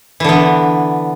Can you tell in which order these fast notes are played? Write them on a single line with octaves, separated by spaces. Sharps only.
E3 D3 B3